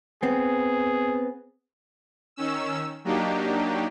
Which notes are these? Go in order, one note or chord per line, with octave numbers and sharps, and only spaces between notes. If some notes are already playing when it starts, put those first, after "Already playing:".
B3 C4 G#4
D#3 C#4 E6
F#3 A#3 D4 D#4 G4